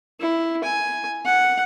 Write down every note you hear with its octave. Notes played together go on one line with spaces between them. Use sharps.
E4
G#5
F#5